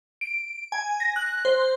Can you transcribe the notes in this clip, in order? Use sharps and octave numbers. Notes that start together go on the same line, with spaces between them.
D7
G#5
A#6
F#6
C5